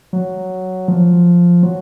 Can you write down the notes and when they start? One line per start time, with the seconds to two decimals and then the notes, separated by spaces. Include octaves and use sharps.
0.13 F#3
0.88 F3
1.63 F#3